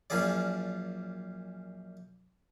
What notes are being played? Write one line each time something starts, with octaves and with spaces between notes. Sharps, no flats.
F#2 A#2 F3 C#4 G#4 D5